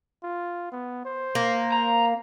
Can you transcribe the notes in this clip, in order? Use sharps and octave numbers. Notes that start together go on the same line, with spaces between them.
F4
B3
C5
A#3
A#5